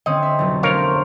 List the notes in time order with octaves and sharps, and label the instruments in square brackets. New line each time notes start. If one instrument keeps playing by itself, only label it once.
[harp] D3 C4 C#4 [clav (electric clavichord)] D#5
[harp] E5
F1 B1
[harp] A3 D4 C5 [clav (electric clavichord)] A#4 C#5 F5